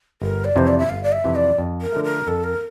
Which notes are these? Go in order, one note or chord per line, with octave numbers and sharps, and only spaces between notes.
G1 A#4
D5
F2 C3 E3 C5
D5
E5
G1 F5
D5
E5
F2 C3 E3
D5
F2
A#4
D3 F3 A3
A#4
F2 A4
A#4